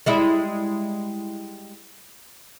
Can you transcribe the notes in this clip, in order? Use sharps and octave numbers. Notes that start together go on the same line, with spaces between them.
G3 G#3 E4